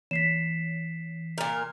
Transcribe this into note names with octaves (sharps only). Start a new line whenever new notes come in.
E3 B6 C7 E7
A#2 A#4